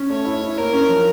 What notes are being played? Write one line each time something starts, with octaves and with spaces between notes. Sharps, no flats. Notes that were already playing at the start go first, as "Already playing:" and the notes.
Already playing: C#4
A3 C#5
E4
E4
A#3 A#4
C#4
F3